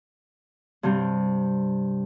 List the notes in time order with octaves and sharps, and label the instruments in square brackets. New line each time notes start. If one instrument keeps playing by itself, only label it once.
[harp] G2 C3 G3